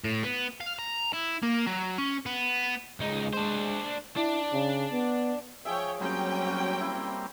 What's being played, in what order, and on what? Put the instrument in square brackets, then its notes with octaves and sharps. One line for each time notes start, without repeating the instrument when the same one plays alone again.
[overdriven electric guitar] A2
B3
F5
A#5
E4
A#3
F#3
C#4
B3
[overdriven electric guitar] C#2 D#4 [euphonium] G#3
[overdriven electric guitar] D4 C5
[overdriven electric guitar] D4 [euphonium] E4
[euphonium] C#3
B3
[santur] F3 G#4 E5 [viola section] C#5 G5
[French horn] F#3 [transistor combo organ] G3 A#3 C4 [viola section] C#4 G5
[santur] F#4
E4